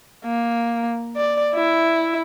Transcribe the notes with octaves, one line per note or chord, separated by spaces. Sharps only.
A#3
D5
E4